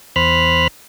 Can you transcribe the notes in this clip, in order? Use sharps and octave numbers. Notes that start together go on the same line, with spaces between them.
E2 C5 B5 F6 F#6